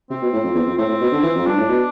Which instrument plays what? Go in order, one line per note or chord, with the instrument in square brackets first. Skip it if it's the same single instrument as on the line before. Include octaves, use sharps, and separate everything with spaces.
[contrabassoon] C3 [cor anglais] C4
[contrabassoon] B2
A2
F2
E2
F2
[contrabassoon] A2 [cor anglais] C4
[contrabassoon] A2
B2
D3
E3
F2
[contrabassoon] G2 [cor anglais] D4
[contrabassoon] A2
B2